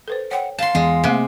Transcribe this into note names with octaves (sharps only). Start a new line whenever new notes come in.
A4 B4 C5
C#5 F#5 G5
F5 A5 C6
E2 G#3
C3 A3 A#3 E5